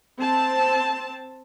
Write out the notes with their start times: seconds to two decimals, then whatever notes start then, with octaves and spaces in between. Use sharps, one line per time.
0.19 C4 A5